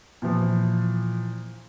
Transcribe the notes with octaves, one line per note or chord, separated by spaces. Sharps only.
A#2 E3 F3